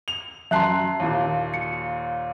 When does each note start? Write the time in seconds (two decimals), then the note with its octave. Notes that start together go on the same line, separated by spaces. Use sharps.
0.08 F7
0.51 F#2 E5 A5 C6 F#6 C7
1.00 D#2 A#2
1.54 C#7